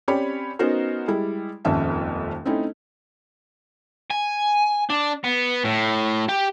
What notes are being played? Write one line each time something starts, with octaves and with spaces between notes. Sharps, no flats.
C4 C#4 G4 C#5 D5 B5
B3 C#4 D#4 F#4 A#4 C5
G3 G#3 E4
D#1 G#1 F2 C#4 E5 A5
A3 C4 C#4 D#4 E4
G#5
D4
B3
A2
G4